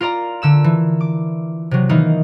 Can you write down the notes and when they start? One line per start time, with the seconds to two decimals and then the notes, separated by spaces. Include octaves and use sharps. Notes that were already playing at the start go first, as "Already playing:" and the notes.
0.01 F4 A#4 D5 A#5
0.42 D3 E6 E7
0.64 E3
1.01 D6
1.71 C3 F#3
1.89 D#3 E3 A#3 D#4